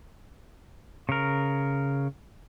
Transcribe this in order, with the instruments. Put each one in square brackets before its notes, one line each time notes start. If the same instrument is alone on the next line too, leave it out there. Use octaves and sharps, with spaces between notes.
[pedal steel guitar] C#3 A#4